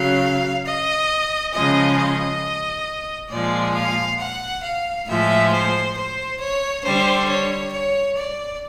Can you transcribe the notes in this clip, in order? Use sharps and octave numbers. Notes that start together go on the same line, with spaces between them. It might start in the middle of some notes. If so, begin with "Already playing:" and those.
Already playing: C#3 F#3 F5
D#5
C#3 F3 G#3 D#5
D#5
A#2 F3 G#3 D5
F5
F#5
F5
A2 F3 G#3 E5
C5
C5
C#5
D3 G3 C5
C#5
C#5
D5